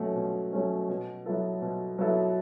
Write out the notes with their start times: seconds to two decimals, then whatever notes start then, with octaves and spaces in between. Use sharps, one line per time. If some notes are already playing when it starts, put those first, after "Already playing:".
Already playing: B2 F#3 A3 C#4
0.15 B2
0.53 F#3 A3 C#4
0.89 B2
1.26 F#3 B3 E4 A4
1.62 B2
1.98 F#3 B3 E4 A4